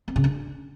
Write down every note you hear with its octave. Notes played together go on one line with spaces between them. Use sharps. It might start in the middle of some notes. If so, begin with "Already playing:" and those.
C4
C#3
D4